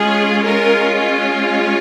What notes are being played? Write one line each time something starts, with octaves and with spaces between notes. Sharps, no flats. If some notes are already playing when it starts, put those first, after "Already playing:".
Already playing: G#3 C#4 F4 G#4
A#4